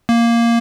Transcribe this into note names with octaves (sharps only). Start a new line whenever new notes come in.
A#3